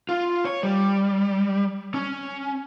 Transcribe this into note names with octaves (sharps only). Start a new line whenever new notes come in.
F4
C#5
G3
C#4